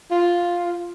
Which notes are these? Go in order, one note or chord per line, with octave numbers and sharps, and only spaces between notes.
F4